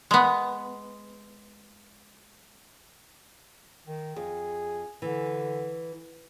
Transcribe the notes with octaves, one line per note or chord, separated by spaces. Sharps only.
G#3 B3
D#3
F2 G#4
D3 E3